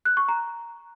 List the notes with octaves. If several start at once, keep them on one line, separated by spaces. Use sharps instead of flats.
F#6
C#6
A#5